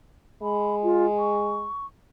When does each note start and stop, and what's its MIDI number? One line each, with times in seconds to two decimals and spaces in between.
0.42 1.69 56
0.42 0.76 83
0.83 1.06 65
1.19 1.86 85